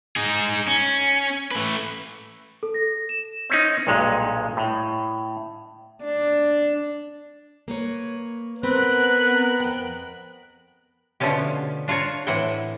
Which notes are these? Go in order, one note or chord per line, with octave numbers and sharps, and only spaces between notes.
D#4 G#4
C#4
A3 B4
A4
A#6
E7
C4 C#4 D#4
B1 G2 A#2 G#3
A2
D4
A#3 B4 C#5
B3 C4 A#4 B4 F#6
F2 G5
B2 D3 F3 A3 C#4 G4
D4 F4 A#4 C#5
A2 E3 C4 E4 F#5 G5